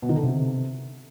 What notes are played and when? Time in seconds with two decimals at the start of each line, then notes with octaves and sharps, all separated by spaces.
0.02 B2
0.09 D#3
0.16 D3
0.23 C3